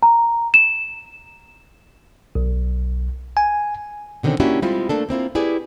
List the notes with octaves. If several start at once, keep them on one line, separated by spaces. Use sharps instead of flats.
A#5
E7
B1
G#5
B2 D3 D#3 C4 C#4
A#3 C#4 D4 E4 F#4 G4
G3 G#3 C4 E4 F4 G4
A3 A#3 D4 A4
A#3 C4 E4 F4
E4 G4 G#4 B4 D5